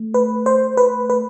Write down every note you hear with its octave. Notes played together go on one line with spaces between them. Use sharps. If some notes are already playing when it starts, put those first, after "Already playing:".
Already playing: A3
B4
C5
B4
B4